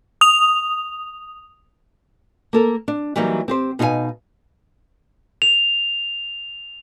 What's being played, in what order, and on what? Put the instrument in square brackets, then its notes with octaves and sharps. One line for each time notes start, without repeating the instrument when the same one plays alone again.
[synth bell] D#6 F7
[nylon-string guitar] A#3 A4 A#4
D4
E3 F#3 G3 A#3 D#4
C4 G4 C5
B2 D#4 G#4 B4 F5 G#5
[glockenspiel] F7